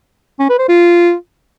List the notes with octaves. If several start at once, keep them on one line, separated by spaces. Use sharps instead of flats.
C#4
B4
C5
F4